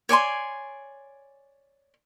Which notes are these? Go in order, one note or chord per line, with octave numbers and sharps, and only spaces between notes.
C#5 D5 G#5 C6